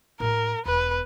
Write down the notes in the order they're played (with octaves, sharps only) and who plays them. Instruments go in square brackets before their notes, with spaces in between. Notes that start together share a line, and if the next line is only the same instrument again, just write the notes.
[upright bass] A2 G#3 [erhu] A#4
[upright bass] E1 E2 [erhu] B4